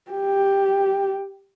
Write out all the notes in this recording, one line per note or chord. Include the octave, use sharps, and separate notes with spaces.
G4